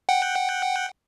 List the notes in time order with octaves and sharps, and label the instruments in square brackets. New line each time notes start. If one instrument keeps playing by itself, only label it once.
[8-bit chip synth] F#5 G5